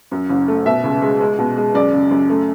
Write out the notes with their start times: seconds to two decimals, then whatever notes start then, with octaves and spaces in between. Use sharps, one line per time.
0.11 F#2
0.29 F#1
0.48 A3
0.66 B2 E5
0.84 C#2
1.02 G#3
1.21 G#3
1.38 B2
1.57 G#3
1.74 F#2 D5
1.92 C#3
2.11 F#2
2.30 A3